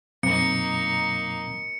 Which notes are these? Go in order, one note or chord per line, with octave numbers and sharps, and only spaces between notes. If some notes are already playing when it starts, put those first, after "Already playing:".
F#2 B2 F#3 A#3 C4 D#4 C#7